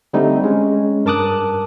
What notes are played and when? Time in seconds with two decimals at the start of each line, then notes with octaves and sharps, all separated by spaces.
0.13 D3 G3 A3 C4 D#4
0.44 G#3 C#4
1.05 G2 A#4 A5 D6 D#6 F#6